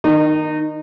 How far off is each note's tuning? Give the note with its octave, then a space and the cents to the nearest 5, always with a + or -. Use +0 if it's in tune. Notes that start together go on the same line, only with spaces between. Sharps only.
D#3 +0 D#4 -30